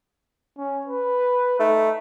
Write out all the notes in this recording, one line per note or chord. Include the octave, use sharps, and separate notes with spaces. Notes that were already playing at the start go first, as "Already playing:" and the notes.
C#4
B4
A3 D#4